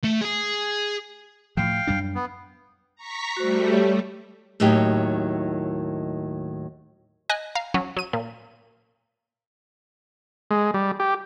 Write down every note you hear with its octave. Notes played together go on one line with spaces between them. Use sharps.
A3
G#4 G#5
A2 F3 F5 G5
F#2 G3 D4
B3
A#5 C#6 B6
G3 A3 F#4 C5
G4 C#5
D#2 A2 D#3 F#3 D#4 G4
D#5 G#5 F#6
F5 A#5
F#3 C#4
F#3 D#7
A#2
G#3
G3
G4